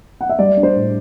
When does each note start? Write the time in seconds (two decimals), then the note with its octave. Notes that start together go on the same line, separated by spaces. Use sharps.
0.21 F#5
0.29 E5
0.39 G3 D5
0.57 D4
0.63 C5
0.75 A2